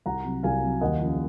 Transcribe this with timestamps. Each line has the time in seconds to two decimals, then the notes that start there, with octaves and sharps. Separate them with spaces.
0.06 C2 F#5 A#5
0.25 C3 F#3
0.43 C2 F5 G#5
0.63 C3 F#3
0.81 D#2 D#5 F#5
1.01 C#3 F3